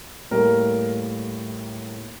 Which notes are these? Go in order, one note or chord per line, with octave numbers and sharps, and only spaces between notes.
A2 G3 A#3 A#4